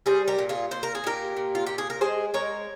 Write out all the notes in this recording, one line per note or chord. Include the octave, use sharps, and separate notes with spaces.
G3 G#4 C5
G4 A#4
A#2
F4 G#4
A#2 C5
A#4
G#4
A#2 G4 A#4
A#2
F4
A#2 G4
G#4
A#4
G#3 G#4 C5
G#3 A#4 C#5